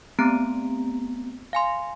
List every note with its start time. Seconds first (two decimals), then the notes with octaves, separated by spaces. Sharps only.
0.19 A3 B3 C4 G4 A#5 D7
1.53 F5 G#5 C6